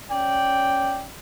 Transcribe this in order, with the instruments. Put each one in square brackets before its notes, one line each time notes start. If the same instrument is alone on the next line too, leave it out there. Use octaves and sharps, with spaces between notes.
[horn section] C#4 D5 G5